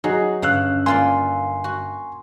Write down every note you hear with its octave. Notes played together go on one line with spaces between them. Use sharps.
F#3 D#4 F#4 G#4
G1 C#3 F5 F#5 E6 F#6
A#3 F4 D5 G#5 C6
F#4